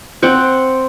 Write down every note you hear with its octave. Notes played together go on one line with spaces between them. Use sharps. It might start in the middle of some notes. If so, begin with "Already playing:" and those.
C4 F#5 G5